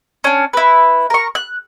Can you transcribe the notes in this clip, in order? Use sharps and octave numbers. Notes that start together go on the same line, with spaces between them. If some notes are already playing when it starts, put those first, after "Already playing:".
C#4 D4
E4 B4
A#4 C#6
F#6